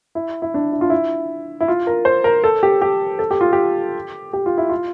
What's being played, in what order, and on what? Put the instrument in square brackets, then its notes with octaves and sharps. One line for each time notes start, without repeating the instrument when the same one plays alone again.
[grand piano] E4
E4
D4
E4
F4
E4
E4
F4
A#4
C5
A#4
A4
G4
G4
A4
G4
F4
G4
G4
F4
E4
F4